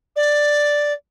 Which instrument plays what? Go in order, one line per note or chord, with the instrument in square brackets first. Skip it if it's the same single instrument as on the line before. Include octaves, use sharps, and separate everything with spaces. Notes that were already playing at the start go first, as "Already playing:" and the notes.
[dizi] D5